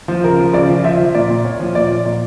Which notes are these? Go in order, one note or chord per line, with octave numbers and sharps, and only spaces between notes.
F3
C#3 A#4
F3
C#3 D5
F3
F3 E5
F3
A#2 D5
A#2
A#2 C#5
F3
A#2 D5
F3
A#2 D5